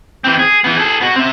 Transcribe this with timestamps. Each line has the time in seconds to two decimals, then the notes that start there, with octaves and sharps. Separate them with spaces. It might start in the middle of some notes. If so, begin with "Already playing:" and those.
0.24 E3 C4
0.39 G#4
0.64 E3 B3
0.78 G#4 A4
1.01 B3 F#4
1.16 C4 E5